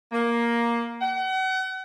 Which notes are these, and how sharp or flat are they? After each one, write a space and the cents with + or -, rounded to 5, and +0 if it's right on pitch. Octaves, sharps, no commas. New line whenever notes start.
A#3 +10
F#5 +35